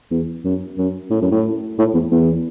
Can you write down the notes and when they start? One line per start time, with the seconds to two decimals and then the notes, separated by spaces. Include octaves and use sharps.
0.11 E2
0.44 F#2
0.78 F#2
1.10 A2
1.21 F#2
1.32 A2
1.78 A2
1.94 E2
2.11 E2